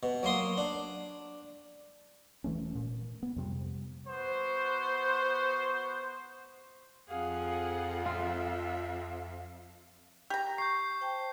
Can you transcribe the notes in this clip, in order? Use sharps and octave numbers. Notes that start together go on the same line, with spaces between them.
B2
F#3 A#3 C6 D#6
D4
E1 E3 A3 C#4
A#2
B3
F2 C3 G3
B3 F#4 C5
F2 G#4 F5 F#5
F4 E5
G4 A#5
C#6 G6 C7
C5 G5 A5